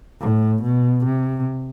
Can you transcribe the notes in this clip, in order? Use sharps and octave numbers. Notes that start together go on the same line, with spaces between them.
A2
B2
C3